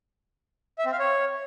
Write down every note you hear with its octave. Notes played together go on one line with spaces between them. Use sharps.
E5
C4
F5
C#5